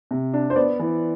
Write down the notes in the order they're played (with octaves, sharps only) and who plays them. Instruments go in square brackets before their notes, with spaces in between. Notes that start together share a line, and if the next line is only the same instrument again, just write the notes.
[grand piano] C3
D4
[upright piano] C5
[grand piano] B3 [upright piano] D5
[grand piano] E3